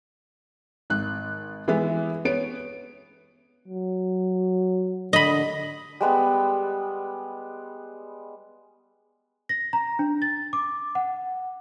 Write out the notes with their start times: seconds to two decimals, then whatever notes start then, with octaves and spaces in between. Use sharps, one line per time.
0.90 G#1 F#6
1.68 E3 G#3 B3 E4
2.25 B3 C#5 D7
3.68 F#3
5.13 D3 D#5 B5
6.01 G3 G#3 B3 B5
9.49 A#6
9.73 A#5
9.99 D4
10.22 A6
10.53 D6
10.95 F#5